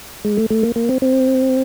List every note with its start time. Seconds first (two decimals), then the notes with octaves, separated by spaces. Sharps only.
0.25 G#3
0.37 A3
0.50 A3
0.63 A#3
0.76 A#3
0.89 C4
1.02 C4